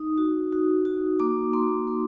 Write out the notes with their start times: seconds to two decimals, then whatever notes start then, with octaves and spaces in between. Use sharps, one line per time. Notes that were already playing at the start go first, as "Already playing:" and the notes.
Already playing: D#4 D#6
0.18 F#4
0.52 F#4
0.85 F#4
1.20 A#3 D6
1.53 A#3 C6
1.87 A#3